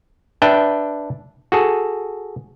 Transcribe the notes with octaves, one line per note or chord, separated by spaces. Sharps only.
D4 B4 E5 G5
F#4 G#4 A4